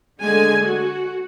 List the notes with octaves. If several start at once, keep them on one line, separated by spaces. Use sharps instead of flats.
D3 G#3 G#5
F#4